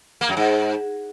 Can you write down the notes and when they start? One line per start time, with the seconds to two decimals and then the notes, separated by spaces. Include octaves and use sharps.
0.21 A#3
0.29 F#2
0.37 G#2